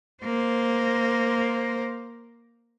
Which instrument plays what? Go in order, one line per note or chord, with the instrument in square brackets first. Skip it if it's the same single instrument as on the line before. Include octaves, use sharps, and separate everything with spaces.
[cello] A#3 C5